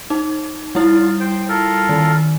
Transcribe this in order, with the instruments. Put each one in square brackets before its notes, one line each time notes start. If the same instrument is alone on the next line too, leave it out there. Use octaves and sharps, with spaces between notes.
[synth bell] D#4
[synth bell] G3 E4 [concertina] F4
[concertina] C5 G5
F4 A4 A#4
[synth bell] D#3